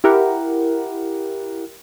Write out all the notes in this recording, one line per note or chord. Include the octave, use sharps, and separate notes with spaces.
E4 G4 A#4 F#5